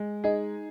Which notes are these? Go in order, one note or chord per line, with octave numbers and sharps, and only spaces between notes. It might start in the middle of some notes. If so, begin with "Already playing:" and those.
Already playing: G#3
D#4 G#4